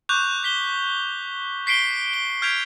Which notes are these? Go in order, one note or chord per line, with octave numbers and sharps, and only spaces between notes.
C#6 D6 F#6 G6 F7
F#6 B6 G7
C#6 B6 C7 D7 G7
G7
F6 G6 G#6 B6 D7 F7